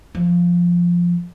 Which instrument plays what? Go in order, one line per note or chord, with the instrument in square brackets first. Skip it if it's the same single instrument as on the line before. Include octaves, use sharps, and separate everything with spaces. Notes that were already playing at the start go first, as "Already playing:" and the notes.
[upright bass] F3